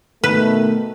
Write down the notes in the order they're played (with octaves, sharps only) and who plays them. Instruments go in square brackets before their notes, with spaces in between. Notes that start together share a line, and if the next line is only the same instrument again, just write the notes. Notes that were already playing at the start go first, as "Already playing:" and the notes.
[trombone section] B2 D#3 A3 [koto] B4